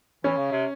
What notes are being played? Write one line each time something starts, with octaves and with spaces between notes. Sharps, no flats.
E3 C#4
C#3
C3